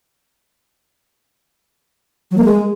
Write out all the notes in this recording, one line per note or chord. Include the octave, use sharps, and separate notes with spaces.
F#3
A#3
G#3